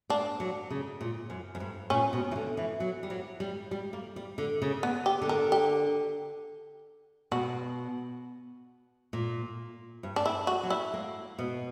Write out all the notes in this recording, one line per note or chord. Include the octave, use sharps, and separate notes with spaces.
A#3 D4
F#3
C#3
A#2
F#2
F#2
G2
A#2 C#4
B2
E3
D3
E3
F#3
G3
F#3
G3
G3
A#3
G3
D3
C#3
B3
G4
D3
A#4
G4
B2 F#4
A#2
G2
D4
E4
F#4
F#3
E4
A#3
B2